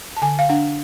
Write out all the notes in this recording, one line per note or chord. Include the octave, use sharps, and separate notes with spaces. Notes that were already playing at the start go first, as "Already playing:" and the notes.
A5
D3 G#5
F5
D4 F#5